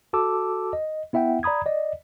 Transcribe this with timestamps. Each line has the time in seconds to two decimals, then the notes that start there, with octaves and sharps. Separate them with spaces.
0.13 F#4 A4 A5 D6 E6
0.73 D#5
1.13 B3 E4 E5 F#5 G5
1.43 D5 A#5 B5 D#6 G#6
1.66 D5 D#5